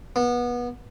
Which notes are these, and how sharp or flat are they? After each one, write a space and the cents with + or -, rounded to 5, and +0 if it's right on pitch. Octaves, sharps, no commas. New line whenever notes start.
B3 -25